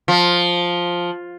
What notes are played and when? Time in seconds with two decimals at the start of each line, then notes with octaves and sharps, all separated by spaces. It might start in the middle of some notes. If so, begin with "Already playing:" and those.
0.08 F3